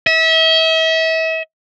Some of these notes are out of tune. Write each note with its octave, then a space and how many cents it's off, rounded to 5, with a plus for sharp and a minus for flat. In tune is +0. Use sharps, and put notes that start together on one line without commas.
E5 -35